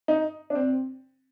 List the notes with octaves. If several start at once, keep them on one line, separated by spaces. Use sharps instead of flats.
D#4
D4
C4